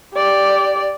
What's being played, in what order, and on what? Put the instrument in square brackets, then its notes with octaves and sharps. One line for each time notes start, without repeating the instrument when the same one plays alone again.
[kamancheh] G4 D5